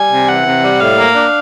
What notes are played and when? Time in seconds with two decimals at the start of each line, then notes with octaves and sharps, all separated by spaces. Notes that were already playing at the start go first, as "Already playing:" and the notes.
Already playing: G3 G#5
0.11 C3
0.28 E3 F#5
0.46 C3
0.63 G3
0.80 A2 F5
0.98 A#3
1.15 D4